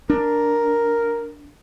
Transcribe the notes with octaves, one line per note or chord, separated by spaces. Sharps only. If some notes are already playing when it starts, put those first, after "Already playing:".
D4 A#4